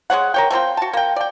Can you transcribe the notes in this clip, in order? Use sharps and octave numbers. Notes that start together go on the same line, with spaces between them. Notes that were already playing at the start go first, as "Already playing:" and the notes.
G#3 D4 C#5 F#5
A#4 C#5 G5
A3 C4 F4 G5
F#4 A5
A#3 G5
D5 G5